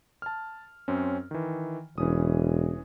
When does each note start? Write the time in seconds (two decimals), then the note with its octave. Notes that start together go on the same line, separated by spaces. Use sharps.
0.22 A5 F6
0.88 F#2 C4 C#4
1.31 D#3 E3
1.98 E1 E3 C#4 D#6